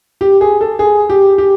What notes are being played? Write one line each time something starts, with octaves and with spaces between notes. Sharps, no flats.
G4
G#4
A4
G#4
G4
G4